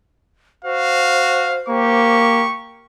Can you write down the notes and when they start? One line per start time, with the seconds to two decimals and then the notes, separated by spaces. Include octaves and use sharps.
0.65 F#4 C5 F5
1.68 A#3 G4 C#6